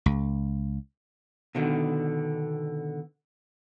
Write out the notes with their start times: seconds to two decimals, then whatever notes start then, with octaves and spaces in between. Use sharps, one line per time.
0.06 C#2
1.55 B2 D3 D#3